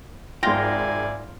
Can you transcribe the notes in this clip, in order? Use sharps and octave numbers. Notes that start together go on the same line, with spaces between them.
G#1 F4 D5 E5 G5 G#5 A#6